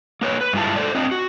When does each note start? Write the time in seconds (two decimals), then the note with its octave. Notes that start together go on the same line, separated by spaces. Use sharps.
0.21 A#3 B4 C#5
0.41 B4
0.53 G2 G#3 E4 F4 A5
0.76 A4 C5 D5
0.95 C4 D4 F4 D#5
1.12 F#4